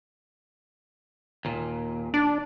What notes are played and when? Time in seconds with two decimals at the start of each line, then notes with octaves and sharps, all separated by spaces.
1.45 D#2 A#2
2.14 D4